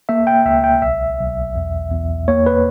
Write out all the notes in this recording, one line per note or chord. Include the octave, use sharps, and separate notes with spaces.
A#3 E5
G5
C#2 E5
G5
B1 E5
B1
E2
E2
A#3 C#5
B4